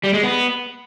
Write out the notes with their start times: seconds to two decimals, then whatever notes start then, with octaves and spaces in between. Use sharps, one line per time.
0.04 G3
0.14 G#3
0.24 B3